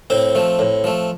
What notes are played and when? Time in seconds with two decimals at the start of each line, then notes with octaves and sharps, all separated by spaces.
0.10 A2 C4 C5
0.35 F3 A3
0.59 A2
0.84 F3 A3